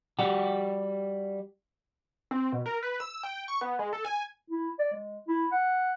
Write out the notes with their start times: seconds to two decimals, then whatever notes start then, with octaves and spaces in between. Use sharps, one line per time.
0.19 G3 F#4 G4
2.31 C4
2.52 B2
2.66 A#4
2.83 B4
3.00 E6
3.23 G5
3.48 C#6
3.61 B3
3.79 G#3
3.93 A4
4.05 G#5
4.50 E4
4.79 D5
4.93 G#3
5.28 E4
5.52 F#5